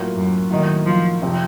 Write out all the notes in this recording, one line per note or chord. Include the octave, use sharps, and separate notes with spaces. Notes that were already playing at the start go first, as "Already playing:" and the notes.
Already playing: A2 F#3 A#3 F4
F#2
A2 D#3 F#3 A#3 D#4
F3
F2 C3 F3 C4